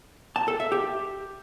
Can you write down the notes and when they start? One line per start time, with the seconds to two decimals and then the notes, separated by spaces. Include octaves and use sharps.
0.36 A5
0.48 A4
0.60 E5
0.72 G4